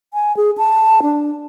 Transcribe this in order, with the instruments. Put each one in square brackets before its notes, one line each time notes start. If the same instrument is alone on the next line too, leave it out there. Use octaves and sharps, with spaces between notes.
[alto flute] G#5
G#4
A5
D4